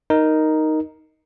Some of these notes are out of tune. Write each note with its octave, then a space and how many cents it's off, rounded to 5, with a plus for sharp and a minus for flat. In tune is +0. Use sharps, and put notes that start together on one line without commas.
D#4 +0 A#4 +0